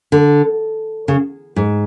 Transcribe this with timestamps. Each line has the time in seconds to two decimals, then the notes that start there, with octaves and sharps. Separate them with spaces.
0.12 D3
1.08 C#3
1.56 G#2